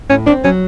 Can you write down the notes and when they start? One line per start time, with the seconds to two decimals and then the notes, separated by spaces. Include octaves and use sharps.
0.10 A2 C#4
0.27 C4 D4
0.44 F#3 C#4